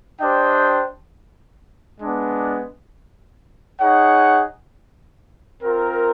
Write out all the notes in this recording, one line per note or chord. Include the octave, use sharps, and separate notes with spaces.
D4 G4 C5 D#5 G5
G#3 B3 D4
D#4 G#4 C#5 F#5
C4 F4 A#4